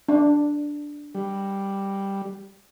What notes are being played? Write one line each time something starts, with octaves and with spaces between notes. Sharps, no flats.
D4
G3